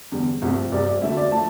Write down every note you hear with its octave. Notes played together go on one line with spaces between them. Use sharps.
E2 D3 G3
C2 C3 F3 A3
C2 C3 G3 D5
D5
D2 D3 A3 E5
D5
F3 A3 A5